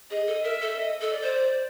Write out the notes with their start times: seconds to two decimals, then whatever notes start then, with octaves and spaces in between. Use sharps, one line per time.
0.10 G#4 D#5
0.28 A4
0.44 A#4 E5
0.62 A4
0.79 D#5
1.01 A4
1.12 D5
1.23 C5